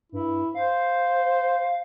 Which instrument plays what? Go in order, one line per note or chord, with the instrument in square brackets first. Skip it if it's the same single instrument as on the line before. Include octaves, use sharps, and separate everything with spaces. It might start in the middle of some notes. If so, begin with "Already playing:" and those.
[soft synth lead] G2 [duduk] E4
[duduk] C5 [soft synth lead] F5